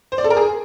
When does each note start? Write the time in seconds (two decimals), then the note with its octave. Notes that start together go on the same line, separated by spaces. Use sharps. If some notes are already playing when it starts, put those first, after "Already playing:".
0.12 C5
0.18 D5
0.24 A4
0.30 A#4
0.37 G#4